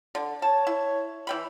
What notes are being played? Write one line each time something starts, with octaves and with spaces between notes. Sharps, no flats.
D3
C#5 A5
E4
E3 G5 B5